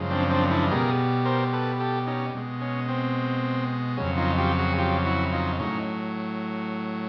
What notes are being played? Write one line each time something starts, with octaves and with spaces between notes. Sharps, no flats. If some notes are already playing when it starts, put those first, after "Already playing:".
Already playing: F#2 C#3 F3 G#3
C4 D4
C4 D4
D4 E4
B2 G3 G#4 A#4
A#4 C5
A4 B4
G4 A4
C#4 D#4
B2 G#3
C#4
C4
F2 C#3 F#3 C#4
D#4 F4
F4 G4
F#4 G#4
F4 G4
E4 F#4
D#4 F4
A2 F#3 C#4 D#4